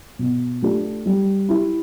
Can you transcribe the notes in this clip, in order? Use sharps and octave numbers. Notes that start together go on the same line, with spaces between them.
B2
A3 D4 G4
G3
E4 G4